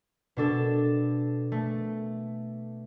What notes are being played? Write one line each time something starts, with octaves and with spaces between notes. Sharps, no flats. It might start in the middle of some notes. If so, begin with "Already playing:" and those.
B2 D4 A4
A3